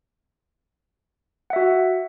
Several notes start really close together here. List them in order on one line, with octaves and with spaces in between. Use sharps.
F#5 E5 F#4